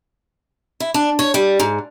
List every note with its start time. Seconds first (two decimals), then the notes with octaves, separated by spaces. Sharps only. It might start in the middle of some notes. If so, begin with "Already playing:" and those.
0.80 E4
0.94 D4
1.19 C#5
1.34 G3
1.59 G#2